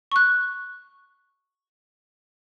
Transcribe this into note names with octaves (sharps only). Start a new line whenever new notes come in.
C#6 F#6